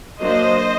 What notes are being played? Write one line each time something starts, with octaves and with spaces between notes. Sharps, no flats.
F#3 A#3 D4 C5 D#5